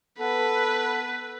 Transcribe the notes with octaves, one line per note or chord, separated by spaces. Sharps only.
B3 A4 B4